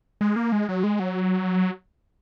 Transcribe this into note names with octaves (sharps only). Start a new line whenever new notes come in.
G#3
A#3
G#3
F#3
G#3
F#3